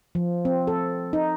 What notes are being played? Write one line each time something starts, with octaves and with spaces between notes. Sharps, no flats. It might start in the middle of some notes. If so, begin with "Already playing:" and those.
F3
C4
A4
D#4